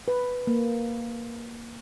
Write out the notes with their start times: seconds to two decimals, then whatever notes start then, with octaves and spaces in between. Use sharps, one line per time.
0.08 B4
0.47 A#3